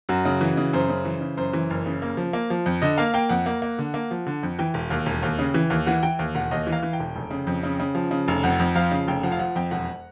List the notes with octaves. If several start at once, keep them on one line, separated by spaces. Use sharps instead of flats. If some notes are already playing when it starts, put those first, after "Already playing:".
F#2 F#4
C#3
E3
C#3
F#2 C5
C#3
E3
C#3
F#2 C5
E3
F#1
C#3
A#3
F3
A#3
F3
F2
D3 D#5
A#3 F5
A#3 G5
F2 F#5
A#3
A#3
D3
A#3
F3
D3
F2
E3 G5
E1
D#2
E1
D#2
C#3
E3
D#2
E3 F#5
E3 G5
D#2
E1 F#5
D#2 D#5
E3
F5
E3
G5
E1
F1
C#3
F2
C#3
C#3
F3
C#3
F1
F2 F#5
F2
F3 F5
C#3
F1 G5
F3 F#5
F5
F3 F#5
F2 G5
E1 F#5